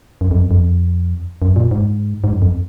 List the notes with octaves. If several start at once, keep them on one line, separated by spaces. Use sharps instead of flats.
F#2
F2
F#2
F2
F#2
A#2
G#2
G#2
F#2
F2